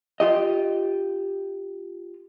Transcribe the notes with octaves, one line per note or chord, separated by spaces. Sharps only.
F4 G4 D#5